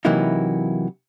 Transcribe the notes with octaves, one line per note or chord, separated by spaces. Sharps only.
C3 E3 F#3 A#3 D#4 E4